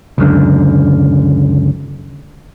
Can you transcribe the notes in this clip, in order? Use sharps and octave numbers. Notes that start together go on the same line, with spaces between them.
C#2 F#2 D3